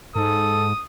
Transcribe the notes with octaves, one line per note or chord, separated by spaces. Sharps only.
G#2 A4 D#6